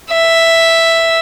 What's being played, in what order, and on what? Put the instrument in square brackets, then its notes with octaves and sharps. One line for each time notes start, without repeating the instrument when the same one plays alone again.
[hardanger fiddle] E5